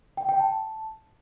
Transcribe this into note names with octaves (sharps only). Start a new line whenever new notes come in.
G5
G5
A5